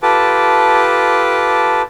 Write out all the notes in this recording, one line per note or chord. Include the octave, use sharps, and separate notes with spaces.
F4 G4 A4 B4 A5 D6